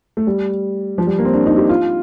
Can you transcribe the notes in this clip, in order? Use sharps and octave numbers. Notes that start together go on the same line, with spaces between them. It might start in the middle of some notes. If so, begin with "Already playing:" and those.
A3
G3
F3
G3
A#3
C4
D4
D#4
G4
F4